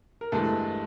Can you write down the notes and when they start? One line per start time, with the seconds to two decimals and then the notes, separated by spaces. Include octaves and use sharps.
0.21 A#4
0.32 G2 E3 G#3 A3 A4